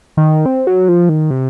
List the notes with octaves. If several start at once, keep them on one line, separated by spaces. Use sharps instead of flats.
D#3
C4
F#3
F3
D#3
C3